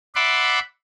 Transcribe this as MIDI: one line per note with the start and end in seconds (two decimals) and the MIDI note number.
0.16 0.59 74
0.16 0.59 76
0.16 0.59 78
0.16 0.59 83
0.16 0.59 84
0.16 0.59 86